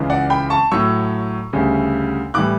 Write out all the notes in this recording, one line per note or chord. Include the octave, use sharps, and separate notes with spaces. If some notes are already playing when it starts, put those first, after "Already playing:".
Already playing: C#2 C#3 E3
D5 F#5
G5 B5
A5 C#6
A2 F#3 C#6 E6
D2 C#3 G3
A2 E3 G3 D6 F#6